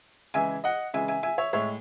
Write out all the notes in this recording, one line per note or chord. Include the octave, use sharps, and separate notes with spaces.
C#3 E3 G#3 E5 G#5
D#5 F#5
C#3 E3 G#3 E5 G#5
E5 G#5
E5 G#5
C#5 E5
A2 G#3 C#5 E5